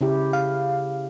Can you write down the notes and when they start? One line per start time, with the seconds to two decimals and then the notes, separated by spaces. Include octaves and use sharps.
0.01 C#3 E4 G4
0.33 F5